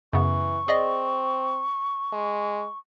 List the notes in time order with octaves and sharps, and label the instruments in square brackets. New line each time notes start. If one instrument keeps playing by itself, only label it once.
[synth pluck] F#2 C#3 B3 [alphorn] E3 [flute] C#6
[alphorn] C4 [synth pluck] G#4 D5 D#5
[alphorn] G#3